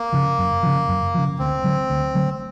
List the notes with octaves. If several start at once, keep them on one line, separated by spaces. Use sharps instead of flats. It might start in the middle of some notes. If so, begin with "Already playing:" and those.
Already playing: A#3
C#3 F3
F#2
C#3 F3
F#2
C#3 F3
D2 C4
D3 F#3 A3
D2
D3 F#3 A3